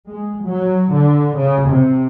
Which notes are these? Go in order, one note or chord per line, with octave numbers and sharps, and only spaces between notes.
G#3
F#3
D3
C#3
C3